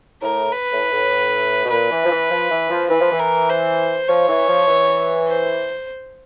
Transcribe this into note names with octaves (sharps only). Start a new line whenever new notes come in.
A2 A#4
B4
A2
A2
B2
A#2 B4
E3
F3
E3
F3
E3
F3
E3 B4
F3
E3
A#4
C5
F3 C#5
E3
F3
E3
C5